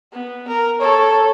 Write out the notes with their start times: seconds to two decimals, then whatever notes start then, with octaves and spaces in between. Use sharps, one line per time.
0.12 B3
0.48 A#4
0.81 A4 C#5